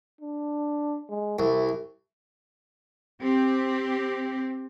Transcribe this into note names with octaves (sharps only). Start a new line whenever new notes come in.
D4
G#3
C2 E4
C4 G4